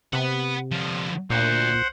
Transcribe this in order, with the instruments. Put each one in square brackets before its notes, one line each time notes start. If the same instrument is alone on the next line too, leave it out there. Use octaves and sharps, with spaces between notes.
[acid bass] C3 [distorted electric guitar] B4 F#5
[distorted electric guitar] D3 F3
[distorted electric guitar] D2 [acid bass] A#2 [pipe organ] C5 F#5